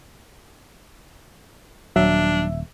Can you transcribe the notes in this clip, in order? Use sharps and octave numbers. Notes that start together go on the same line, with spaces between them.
D#1 F#3 D4 E5